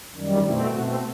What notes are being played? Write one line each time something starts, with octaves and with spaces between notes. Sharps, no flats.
F#2 D#3 G3
B2 A3 C4 E4
B2 A3 C4 F#4